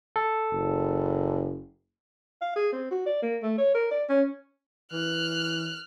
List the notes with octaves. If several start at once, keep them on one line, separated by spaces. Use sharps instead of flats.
A4
F#1
F5
G#4
C4
F#4
D5
A#3
A3
C#5
A#4
D5
C#4
E3 F6 F#6